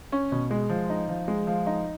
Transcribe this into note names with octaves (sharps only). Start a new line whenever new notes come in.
C#4
B2
G#3
F3
D#4
F3
G#3
F3
D#4